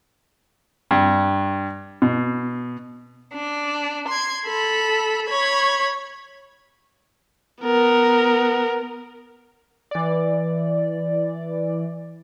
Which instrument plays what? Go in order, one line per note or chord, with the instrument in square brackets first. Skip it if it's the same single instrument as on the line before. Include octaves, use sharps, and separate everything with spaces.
[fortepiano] G2
B2
[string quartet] D4
C6 G#6
A4 B5
C#5 B5 G#6
[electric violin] B3 A#4
[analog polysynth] E3 D5